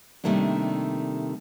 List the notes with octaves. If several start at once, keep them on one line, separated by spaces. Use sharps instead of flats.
C3 D#3 G3 A3 A#3 D4